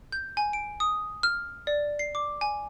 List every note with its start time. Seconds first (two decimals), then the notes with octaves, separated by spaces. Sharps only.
0.12 G6
0.37 G#5
0.53 D7
0.80 D#6
1.23 F6
1.67 D5
1.99 C7
2.15 D6
2.41 G#5